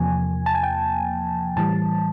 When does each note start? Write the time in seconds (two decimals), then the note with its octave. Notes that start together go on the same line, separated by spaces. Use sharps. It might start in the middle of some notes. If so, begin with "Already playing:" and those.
Already playing: E2 C3 F3 A#3 G#5
0.46 A5
0.55 G#5
0.63 G5
1.56 A2 E3 G3 A5